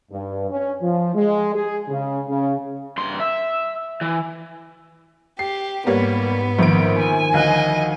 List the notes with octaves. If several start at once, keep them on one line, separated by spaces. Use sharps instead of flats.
G2
C#4
F3
G#3
G#4
C#3
C#3
G2 C6
E5
E3
G4 C7
G#2 G3 A#3 B3 C#5
A#1 D#3 F3 A#4 D7
G#5
D2 D#5 F5 F#6